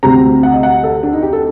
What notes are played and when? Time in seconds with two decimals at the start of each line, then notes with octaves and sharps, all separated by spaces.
0.03 D2 C3 G3 C4 A#5
0.43 F#5
0.54 D#5
0.63 F#5
0.83 A4
1.03 D4
1.13 D#4
1.22 G4
1.33 A4